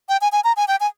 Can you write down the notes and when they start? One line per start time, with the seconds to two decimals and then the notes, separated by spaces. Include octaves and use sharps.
0.09 G5
0.21 G#5
0.32 G#5
0.44 A#5
0.57 G#5
0.68 G5
0.80 G#5